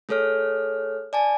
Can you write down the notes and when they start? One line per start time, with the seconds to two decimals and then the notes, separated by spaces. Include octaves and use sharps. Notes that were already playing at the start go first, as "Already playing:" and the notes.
0.09 A3 G#4 A4 C#5 F6
1.13 D5 G#5 A5